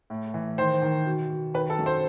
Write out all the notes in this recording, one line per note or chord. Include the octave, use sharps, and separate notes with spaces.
A2
E3
D#3 C5 C6
D#3
B2
B2
D#3 B4 B5
A4 A5
F#2
C5 C6